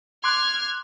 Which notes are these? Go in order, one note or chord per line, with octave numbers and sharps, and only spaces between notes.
C6 D6 F6 F#6 G#6